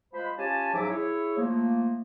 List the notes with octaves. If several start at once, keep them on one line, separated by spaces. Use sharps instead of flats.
F3 G#3 C5 B5
C#4 F4 G4 G#5 A5
G#2 C#3 F3 F#3 E5 D6
E4 G#4 C#5
F3 A3 A#3